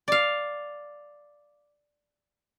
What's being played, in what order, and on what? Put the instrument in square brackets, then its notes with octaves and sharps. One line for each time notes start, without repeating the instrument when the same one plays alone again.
[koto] D5 F5